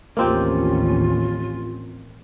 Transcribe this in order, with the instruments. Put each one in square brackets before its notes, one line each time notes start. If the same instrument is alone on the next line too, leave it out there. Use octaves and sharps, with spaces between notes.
[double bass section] A1 D#2 C#4 [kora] A#3 C4 G4 [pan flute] F4